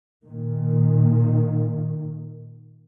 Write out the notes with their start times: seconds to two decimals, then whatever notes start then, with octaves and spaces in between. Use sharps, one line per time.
0.24 A#2 D#3